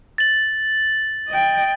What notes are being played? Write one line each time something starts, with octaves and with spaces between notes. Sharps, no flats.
A6 F#7
D#5 G5